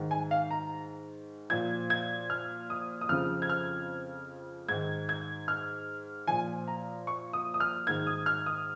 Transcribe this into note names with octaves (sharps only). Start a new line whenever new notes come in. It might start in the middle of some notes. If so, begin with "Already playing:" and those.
Already playing: G#2 D#3
G#5
F5
A#5
A#2 F3 G#6
G#6
F6
D#6
D#6
F2 C#3 F3 F6
G#6
F6
G#2 D#3 G#6
G#6
F6
A#2 F3 G#5
A#5
C#6
D#6
D#6
F6
G#2 D#3 G#6
D#6
F6
D#6